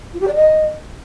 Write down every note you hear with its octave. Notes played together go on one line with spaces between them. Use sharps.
F4
G4
D5
D#5